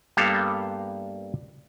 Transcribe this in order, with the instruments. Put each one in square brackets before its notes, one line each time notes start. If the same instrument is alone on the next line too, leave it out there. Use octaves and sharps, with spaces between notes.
[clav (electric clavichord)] G2 G3 A#3 B3 A4 F5